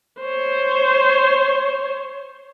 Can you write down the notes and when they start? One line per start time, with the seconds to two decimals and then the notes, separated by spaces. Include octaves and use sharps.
0.21 C5 C#5